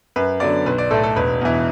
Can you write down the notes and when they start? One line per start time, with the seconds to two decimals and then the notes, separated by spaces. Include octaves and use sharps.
0.16 F#2 B4
0.40 D3 F#3 B3 D5
0.66 B1 B4
0.78 D5
0.91 A2 A3 A4
1.03 A4
1.16 E1 B4
1.41 E2 E3